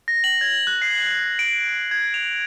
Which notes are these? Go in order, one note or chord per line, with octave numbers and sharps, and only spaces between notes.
A#6
F#7
G#6
F#6
C7
D7
G#6
F7